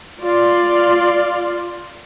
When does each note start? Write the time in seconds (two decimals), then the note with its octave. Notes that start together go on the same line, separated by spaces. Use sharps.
0.20 F4 D5 F5 C6